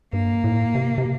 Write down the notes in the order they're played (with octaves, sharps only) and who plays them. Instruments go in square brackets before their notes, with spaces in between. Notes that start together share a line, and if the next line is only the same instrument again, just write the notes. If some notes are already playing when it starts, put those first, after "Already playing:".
[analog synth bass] G2 [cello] A#3
[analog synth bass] A2
C3
C3